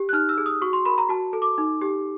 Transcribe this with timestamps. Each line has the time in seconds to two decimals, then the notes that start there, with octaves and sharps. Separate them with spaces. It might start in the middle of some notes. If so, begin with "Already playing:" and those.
Already playing: G4
0.09 F#6
0.13 D#4 F6
0.29 E6
0.38 G#4
0.46 D#6
0.62 F#4 C#6
0.73 C6
0.85 A#4 B5
0.98 A#5
1.09 F#4 A5
1.33 A4
1.42 D6
1.58 D#4
1.82 G4